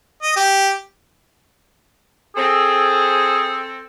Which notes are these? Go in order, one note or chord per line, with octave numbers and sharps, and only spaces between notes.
D#5
G4
C4 G#4 A4